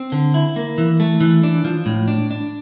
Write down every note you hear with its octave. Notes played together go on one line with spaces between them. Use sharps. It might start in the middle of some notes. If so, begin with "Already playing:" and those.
Already playing: C4
D3
E4
A#3
E3
A3
E3
D4
F3
A2
D4
D4